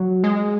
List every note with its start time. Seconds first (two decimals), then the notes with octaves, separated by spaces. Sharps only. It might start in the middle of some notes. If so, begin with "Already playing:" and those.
Already playing: F#3
0.24 G#3